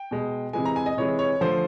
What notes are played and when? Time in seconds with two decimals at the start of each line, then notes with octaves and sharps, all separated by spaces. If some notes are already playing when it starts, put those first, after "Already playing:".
Already playing: G5
0.11 B2 G#3
0.53 C3 E3 G#3 G#5
0.65 A#5
0.76 G#5
0.86 D#5
0.97 C3 E3 G#3 C#5
1.19 C#5
1.41 D3 F3 A3 C5